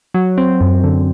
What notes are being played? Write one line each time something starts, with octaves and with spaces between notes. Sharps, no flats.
F#3
C4
F#2
D3